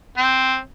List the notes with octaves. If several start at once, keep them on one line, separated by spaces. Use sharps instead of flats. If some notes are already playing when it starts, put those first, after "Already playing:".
C4